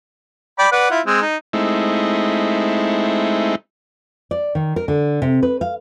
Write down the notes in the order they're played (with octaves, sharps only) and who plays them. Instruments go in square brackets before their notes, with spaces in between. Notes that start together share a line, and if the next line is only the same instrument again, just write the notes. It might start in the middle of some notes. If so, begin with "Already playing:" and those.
[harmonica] D5 G5 B5
B4 D5 F#5
E4 F4
G#3 C4
D#4
[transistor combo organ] G#3 A3 C4 D#4 E4
[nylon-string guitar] D5
D#3
A#4
D3
C3
B4
F5